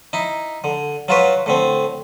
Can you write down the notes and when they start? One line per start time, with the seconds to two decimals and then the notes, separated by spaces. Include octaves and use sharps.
0.13 D#4 E4
0.64 D3
1.08 F#3 F4 F#4 B4
1.46 A2 D3 C4